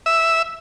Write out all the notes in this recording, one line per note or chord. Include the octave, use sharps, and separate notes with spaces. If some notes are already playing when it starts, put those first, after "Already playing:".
E5